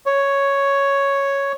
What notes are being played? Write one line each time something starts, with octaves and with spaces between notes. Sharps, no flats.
C#5